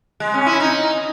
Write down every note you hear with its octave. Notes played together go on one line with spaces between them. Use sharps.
G#3
C#4
E4
D#4